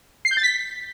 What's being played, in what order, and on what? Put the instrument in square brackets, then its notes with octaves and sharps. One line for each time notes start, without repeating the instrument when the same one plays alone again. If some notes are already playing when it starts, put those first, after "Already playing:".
[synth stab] C7
G6
A6
B6